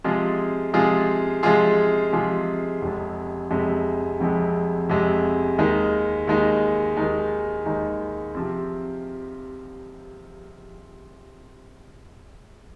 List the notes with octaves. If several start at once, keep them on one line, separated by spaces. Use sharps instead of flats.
C3 F3 G#3 F4 G#4
C3 F3 G#3 F4 G#4
C3 F3 G#3 F4 G#4
C3 F3 G#3 F4 G#4
F1 F2 C3 G#3
F1 F2 C3 G#3
F1 F2 C3 G#3
F1 F2 C3 G#3
D#2 D#3 G#3 D#4
D#2 D#3 G#3 D#4
D#2 D#3 G#3 D#4
D#2 D#3 G#3 D#4
C3 F3 C4